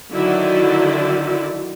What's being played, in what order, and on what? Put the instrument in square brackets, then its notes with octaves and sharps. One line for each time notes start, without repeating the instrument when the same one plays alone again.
[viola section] D3 D#3 F#3 E4 F#4 D5